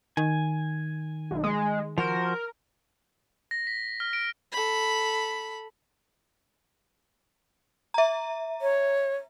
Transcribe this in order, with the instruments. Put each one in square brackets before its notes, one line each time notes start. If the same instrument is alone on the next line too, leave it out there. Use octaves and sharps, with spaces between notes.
[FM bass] D#3 [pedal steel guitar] G#5
[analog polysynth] B1
G#3
[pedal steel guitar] F3 F#4 C5 [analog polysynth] A#4
[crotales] A#6
B6
F6
D7
[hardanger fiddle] A4 B5
[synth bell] E5 A#5
[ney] C#5